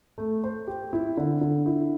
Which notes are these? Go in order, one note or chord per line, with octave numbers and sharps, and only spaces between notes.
A3
C5
G4
E4
D3
D3
E4